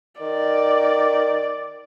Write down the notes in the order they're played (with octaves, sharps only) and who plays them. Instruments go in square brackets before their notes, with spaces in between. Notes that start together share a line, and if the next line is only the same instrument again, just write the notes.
[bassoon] D#3 [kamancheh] D5